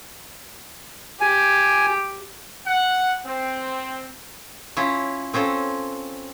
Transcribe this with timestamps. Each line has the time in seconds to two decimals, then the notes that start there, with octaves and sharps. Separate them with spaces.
1.21 G4 G#5
2.66 F#5
3.26 C4
4.77 C#4 E4 F4
5.34 C4 C#4 F4 A4